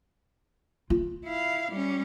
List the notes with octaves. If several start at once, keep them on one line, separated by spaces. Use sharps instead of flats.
F4
E4 F5
G3 C#4